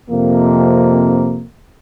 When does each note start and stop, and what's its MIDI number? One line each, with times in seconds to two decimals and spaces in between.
0.10 1.44 41
0.10 1.44 48
0.10 1.44 58